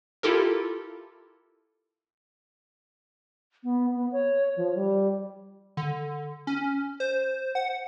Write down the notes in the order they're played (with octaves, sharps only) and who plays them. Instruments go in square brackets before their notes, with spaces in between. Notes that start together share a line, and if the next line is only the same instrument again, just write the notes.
[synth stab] E4 F4 G4 A4 A#4
[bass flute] B3
B3
C#5
F3
G3
[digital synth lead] D3
C#4
C5
F#5